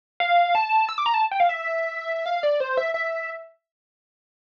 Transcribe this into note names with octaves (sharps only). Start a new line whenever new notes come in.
F5
A5
E6
D6
A#5
A5
G5
F5
E5
F5
D5
C5
E5
E5